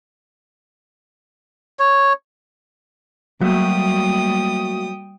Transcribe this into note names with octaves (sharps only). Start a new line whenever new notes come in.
C#5
F#3 G3 A3 A#3 F#4 G5 D#6